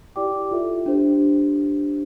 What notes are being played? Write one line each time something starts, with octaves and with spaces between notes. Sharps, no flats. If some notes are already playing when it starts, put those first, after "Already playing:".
E4 G4 D5 G5 D6
F4 A4 E5
D4 G4 C5